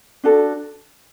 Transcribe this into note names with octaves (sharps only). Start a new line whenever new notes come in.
D4 F#4 A4